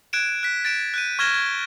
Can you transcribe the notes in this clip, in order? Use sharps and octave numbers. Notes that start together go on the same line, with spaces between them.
F#6 G#6 D7 E7
F#6 B6
A6 D7 E7
F#6 G6 D#7
C#6 F6 G#6 A#6 E7 G7
G#6